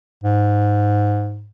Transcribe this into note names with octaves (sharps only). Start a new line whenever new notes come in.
G#2